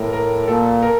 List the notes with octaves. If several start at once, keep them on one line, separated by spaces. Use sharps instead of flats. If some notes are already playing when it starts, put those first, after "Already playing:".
Already playing: A2 A#4
A#4
A#2 A4
A#4